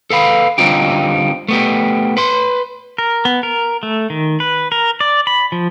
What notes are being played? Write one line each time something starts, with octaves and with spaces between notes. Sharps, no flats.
A4 B4 F5 B5
D3 G3 C4 D#4 F4 G4
A3 B3 G4
B4 C6
A#4
B3
A#4
A3
D#3
B4
A#4
D5
B5
F3